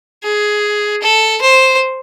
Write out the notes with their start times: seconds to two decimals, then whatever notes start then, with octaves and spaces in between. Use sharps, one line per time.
0.24 G#4
1.02 A4
1.42 C5